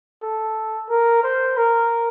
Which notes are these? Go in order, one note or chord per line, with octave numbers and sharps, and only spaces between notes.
A4
A#4
C5
A#4